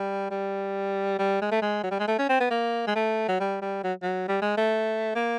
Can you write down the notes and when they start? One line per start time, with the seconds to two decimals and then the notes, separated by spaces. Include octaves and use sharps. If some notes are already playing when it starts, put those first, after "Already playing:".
Already playing: G3
0.31 G3
1.19 G3
1.41 G#3
1.51 A3
1.62 G#3
1.83 F#3
1.91 G3
1.99 G#3
2.08 A3
2.19 C#4
2.29 C4
2.40 B3
2.51 A#3
2.87 G#3
2.95 A3
3.29 F#3
3.40 G3
3.62 G3
3.84 F#3
4.02 F#3
4.28 G3
4.42 G#3
4.57 A3
5.15 A#3